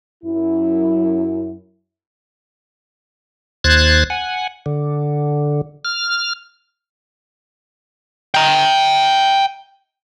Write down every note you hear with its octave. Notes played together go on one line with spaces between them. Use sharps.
F#2 E4
D#2 C5 F#6 G#6 A6
F#5 G#5
D3
F6
G5 A#5